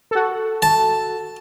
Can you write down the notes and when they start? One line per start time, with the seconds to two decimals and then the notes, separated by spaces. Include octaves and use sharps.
0.11 F#4 A4
0.62 A5